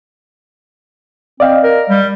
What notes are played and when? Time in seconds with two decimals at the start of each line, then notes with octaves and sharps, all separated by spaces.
1.40 C4 D5 D#5 F5
1.64 A#4
1.89 G3